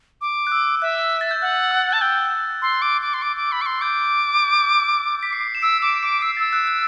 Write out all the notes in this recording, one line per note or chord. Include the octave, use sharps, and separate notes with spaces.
D6
F#6
E6
E5 F#6
A6
G6
F#5 F#6
E6
A5 F#6
G5 E6
C6 E6
D6
D6
C6
D6
D6
B5
D6
C6
D6 G6
B6
C7
E7
E6 D7
D6 E7
D6 D7
E6 C7
E6 A6
F#6
F#6